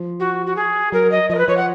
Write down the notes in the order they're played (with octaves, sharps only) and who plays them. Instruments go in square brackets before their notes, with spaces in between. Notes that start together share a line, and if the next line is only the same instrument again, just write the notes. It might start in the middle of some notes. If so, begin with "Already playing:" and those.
Already playing: [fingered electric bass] F3
[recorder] F#4
F#4
G#4
[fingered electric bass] F#3 [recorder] A#4
[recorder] D#5
[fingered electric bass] F3 [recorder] D#5
[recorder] A#4
B4
[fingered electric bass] F3 [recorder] C#5
[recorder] F#5